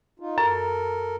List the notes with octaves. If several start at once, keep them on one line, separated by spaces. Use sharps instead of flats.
D#4 F4
F#2 A4 A#4